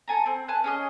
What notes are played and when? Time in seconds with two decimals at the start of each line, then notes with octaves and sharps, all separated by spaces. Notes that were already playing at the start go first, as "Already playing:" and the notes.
0.08 A4 G#5 A#5
0.26 C4
0.48 B4 G#5 A5 F#6
0.64 C#4 G#4 D#5